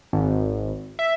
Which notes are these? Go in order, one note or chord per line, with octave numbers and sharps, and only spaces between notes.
G#1
E5